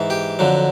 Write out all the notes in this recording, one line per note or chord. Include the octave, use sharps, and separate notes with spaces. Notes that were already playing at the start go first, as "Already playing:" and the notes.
Already playing: G#2 E3
G4
F2 D3 F#3